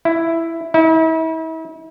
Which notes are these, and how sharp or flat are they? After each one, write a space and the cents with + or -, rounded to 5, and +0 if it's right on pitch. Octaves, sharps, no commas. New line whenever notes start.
E4 +5
E4 -40